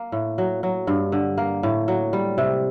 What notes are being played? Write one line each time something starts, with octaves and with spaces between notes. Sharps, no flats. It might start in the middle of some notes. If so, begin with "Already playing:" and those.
Already playing: A#3
A2
F#3
F#3
G2
D3
A#3
A2
F#3
G3
C3